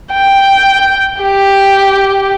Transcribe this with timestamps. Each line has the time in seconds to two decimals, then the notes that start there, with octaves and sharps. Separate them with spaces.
0.13 G5
1.21 G4